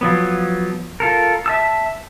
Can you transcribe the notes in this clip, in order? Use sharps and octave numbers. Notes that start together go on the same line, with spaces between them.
F3 F#3 B3
F4 A4 A#4
E5 A5 E6